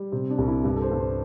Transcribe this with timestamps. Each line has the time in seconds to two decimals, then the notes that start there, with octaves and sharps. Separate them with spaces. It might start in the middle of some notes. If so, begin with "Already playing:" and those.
Already playing: G3
0.12 C3 C4
0.30 D4
0.38 C2
0.48 E4
0.64 G2
0.76 A4
0.82 C5
0.91 G2
1.00 C5